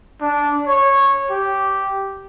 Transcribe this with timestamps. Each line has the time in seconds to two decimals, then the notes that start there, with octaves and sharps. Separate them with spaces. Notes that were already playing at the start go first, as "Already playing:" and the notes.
0.21 D4
0.67 C#5
1.30 G4